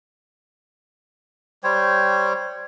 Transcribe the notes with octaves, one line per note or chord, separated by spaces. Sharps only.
G3 C5 C#5 G5